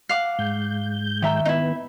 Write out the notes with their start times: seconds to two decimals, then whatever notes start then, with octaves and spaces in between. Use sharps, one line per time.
0.09 F5 F#5 D6
0.39 G#2 G6
1.22 D#3 E5 A#5
1.45 B3 D#4 E4